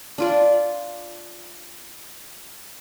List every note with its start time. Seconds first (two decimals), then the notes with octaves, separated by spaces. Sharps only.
0.18 D4 F4 D5